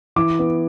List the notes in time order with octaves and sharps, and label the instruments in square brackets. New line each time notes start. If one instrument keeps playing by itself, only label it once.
[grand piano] E3 D6
B3